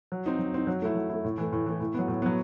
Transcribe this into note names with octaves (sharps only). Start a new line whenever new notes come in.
F#3
C4 D#4
F#3
C4 D#4
F#3
A3 E4
F#3
A3 E4
A2
E3 A3
A2
E3 A3
A2
F#3 B3
A2
F#3 B3